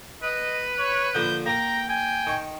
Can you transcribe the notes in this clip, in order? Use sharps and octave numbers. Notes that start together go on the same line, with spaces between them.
B4 D#5
C#5
D3 F3 A#3 G6
A#3 A#4 G5 A#5
G5 G#5
D#3 C#6